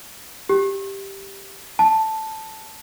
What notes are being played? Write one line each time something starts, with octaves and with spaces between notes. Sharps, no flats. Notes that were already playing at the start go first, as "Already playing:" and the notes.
G4
A5